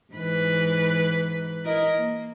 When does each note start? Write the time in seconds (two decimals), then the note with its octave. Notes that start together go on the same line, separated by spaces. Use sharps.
0.13 G#2 E3 B4
1.65 E4 A#4 D#5
1.97 A#3